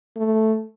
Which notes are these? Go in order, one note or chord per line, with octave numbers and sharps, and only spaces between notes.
A3